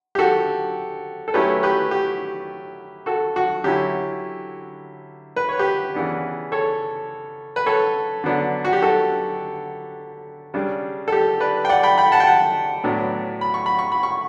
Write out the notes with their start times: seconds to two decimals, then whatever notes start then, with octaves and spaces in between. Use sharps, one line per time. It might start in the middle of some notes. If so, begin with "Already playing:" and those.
0.15 G4
0.19 F#4 A4
1.28 A4
1.34 F#3 A3 C#4 E4 G4 B4
1.63 G4 B4
1.91 G4
3.06 F#4 A4
3.36 F#4
3.64 D3 F#3 C#4 E4 G4
5.36 B4
5.49 C#5
5.59 G4 B4
5.95 C#3 E3 B3 D4
6.52 A4 C#5
7.56 B4
7.66 A4 C#5
8.24 D3 F#3 B3 D4
8.65 F#4
8.73 G4
8.82 F#4 A4
10.54 C#3 G3 D4
11.08 A4
11.12 G4
11.40 B4 D5
11.65 G5
11.69 D5 F#5
11.83 G5 B5
11.98 G5 B5
12.12 F#5 A5
12.20 G5
12.27 F#5 A5
12.84 A2 F#3 B3 D4
13.41 B5
13.54 C#6
13.66 B5
13.79 C#6
13.92 B5
14.03 C#6